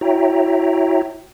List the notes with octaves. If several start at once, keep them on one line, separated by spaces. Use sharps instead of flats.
E4 F#4 C#5 E5 G5 A#5